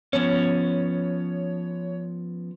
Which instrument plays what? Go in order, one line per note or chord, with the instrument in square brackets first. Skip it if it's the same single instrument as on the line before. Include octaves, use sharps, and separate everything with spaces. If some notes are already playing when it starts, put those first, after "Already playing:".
[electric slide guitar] F3 B3 C#4 [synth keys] C#5